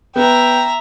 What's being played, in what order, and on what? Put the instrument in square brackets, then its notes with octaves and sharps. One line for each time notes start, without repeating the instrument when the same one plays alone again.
[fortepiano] B3 [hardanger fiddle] E5 A#5 [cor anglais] G5